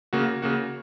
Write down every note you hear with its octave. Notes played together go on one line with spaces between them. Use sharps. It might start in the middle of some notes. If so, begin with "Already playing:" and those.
C#3 A#3 F#4
C#3 A#3 F#4